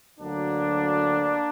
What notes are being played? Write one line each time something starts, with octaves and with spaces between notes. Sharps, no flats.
D2 D3 F#3 A#3 D4